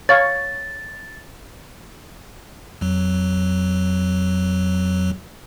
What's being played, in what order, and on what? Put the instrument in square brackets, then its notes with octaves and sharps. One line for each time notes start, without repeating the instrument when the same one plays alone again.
[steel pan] C#5 F5 [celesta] A6
[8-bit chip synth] F2 F#3